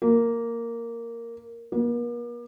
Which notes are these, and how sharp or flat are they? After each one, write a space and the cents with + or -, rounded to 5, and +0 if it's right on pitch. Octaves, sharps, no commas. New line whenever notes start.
A#3 -5
A#3 +45